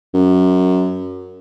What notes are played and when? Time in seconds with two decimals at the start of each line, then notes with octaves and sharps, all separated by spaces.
0.14 F#2